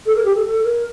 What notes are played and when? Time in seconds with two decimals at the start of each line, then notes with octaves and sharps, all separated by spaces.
0.06 A4
0.15 A#4
0.25 G4
0.35 A4
0.45 A4
0.64 A#4